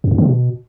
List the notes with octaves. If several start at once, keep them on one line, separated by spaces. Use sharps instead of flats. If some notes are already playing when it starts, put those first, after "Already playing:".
F2
G2
D3
B2